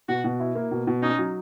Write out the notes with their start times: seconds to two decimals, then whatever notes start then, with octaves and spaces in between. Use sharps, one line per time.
0.08 B2 F#4
0.24 B2
0.40 E4
0.55 A#3
0.71 B2
0.87 B2
1.03 C#4 D#4
1.19 F#3